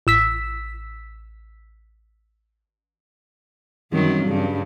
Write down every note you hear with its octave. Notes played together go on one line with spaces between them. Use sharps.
A1 E6 B6
F#2 D#3 E3 F#3 G3 C4
G2 C#3